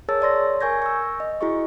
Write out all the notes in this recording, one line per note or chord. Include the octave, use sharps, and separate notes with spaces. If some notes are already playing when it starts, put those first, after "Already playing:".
G#4 A#4 C#5 A5 E6 A6
C#5 D5 C6 A#6
A#4 G#5 C#6 G6 G#6 A#6
C#6 E6
D#5
E4 F#4 G#4 D#5 C#6